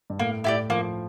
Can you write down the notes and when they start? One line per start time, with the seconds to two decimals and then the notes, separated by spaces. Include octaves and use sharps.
0.10 G2
0.19 A2 A#3
0.44 A2 E4 G4 D5
0.70 F3 A#3